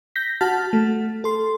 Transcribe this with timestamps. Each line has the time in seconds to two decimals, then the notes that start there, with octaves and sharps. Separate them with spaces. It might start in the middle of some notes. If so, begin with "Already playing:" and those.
0.16 G6 A#6 B6
0.41 F#4 F#5 A5 F6 A6 B6
0.73 A3
1.24 A4 C6